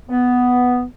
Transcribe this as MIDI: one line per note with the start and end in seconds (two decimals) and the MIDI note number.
0.09 0.83 59